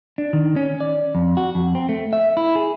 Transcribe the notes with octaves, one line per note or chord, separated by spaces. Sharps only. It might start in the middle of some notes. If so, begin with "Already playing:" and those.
D4
D#3
C#4
D5
F2
F#4
F2
C4
A3
E5
E4
G#4